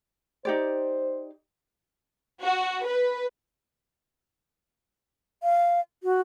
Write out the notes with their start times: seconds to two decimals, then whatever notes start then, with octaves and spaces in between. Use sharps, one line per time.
0.45 D#4 G4 C5 D5
2.41 F#4
2.85 B4
5.43 F5
6.03 F#4